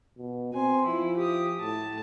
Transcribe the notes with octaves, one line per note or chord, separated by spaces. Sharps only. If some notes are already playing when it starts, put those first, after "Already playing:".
B2
C4 G#5 C6
F3 E4
G4 D#6
A2 A5